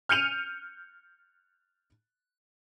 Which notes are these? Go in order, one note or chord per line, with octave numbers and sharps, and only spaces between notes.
F6 G6 C#7 D#7 F7